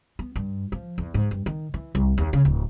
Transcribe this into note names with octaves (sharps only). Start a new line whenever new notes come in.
B3
G2
F3
E2
G#2
G2
D#3
E3
C2
D#2
C#3
D1